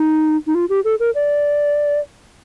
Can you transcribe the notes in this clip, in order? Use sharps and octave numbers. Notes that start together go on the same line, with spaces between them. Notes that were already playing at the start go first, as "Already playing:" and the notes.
Already playing: D#4
D#4
F4
G4
A4
A#4
D5